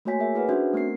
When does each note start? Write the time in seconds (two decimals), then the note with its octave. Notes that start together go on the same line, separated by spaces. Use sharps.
0.05 A3 A#3 F#4 C#5 G#5 B6
0.19 G#4 A#4 E5
0.34 E4 G#4 B4 F#5
0.49 C#4 D4 F#4 C5 E5
0.73 A3 B3 C4 A#4 C7